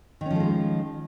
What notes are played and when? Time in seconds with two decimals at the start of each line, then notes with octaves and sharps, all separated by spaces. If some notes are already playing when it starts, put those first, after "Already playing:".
0.21 D#3
0.26 C#4
0.31 F3
0.35 A3
0.40 G#3